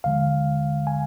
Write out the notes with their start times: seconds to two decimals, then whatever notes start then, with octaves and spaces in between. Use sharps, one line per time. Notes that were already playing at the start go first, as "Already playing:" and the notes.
0.04 D#2 D3 F3 G#3 F5
0.87 G#5